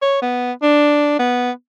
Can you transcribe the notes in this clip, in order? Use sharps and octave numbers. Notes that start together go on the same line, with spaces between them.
C#5
B3
D4
B3